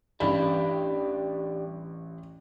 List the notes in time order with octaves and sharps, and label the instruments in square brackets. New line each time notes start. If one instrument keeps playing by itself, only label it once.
[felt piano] A1 B5 [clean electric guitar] G3 D4